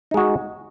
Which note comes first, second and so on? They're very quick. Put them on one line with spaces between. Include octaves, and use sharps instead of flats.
D#4 G#3 F#4